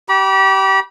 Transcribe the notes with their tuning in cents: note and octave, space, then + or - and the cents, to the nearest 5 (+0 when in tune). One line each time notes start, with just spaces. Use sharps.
G4 -25 B5 -35 D6 +0